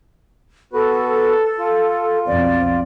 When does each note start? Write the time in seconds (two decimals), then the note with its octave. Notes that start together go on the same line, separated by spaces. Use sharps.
0.73 B3 F#4 A4 B4
1.59 F4
2.27 B1 F2 C4 D5